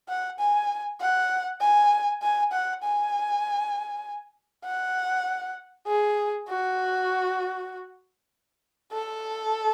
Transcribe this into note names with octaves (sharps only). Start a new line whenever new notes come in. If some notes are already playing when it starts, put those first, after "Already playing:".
F#5
G#5
F#5
G#5
G#5
F#5
G#5
F#5
G#4
F#4
A4